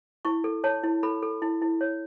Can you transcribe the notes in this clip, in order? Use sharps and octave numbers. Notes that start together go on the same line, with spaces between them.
E4 C#6
A4
C#5 A5
E4
A4 B5
A4
E4
E4
C#5